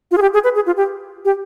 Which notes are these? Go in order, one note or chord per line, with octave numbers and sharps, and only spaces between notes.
F4
G#4
G4
G#4
B4
G#4
F4
G4
G4